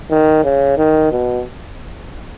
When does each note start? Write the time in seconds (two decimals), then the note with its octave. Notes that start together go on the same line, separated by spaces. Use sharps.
0.11 D#3
0.44 C#3
0.78 D#3
1.12 B2